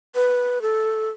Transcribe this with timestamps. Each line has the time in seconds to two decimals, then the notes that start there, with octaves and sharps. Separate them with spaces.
0.15 B4
0.62 A4